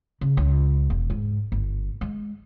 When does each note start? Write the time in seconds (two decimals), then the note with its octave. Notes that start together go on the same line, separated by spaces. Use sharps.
0.21 C#3
0.37 C#2
0.90 E1
1.10 G#2
1.52 G1
2.01 G#3